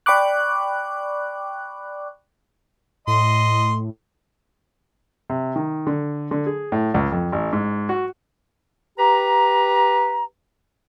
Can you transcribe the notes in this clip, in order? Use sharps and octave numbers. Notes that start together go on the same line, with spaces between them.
D5 G5 B5 C#6 D6 F#6
A2 D#5 C6
C3
D#3
D3
D3
G#4
A2
C#2
F2
A1
G#2
F#4
G4 B4 A#5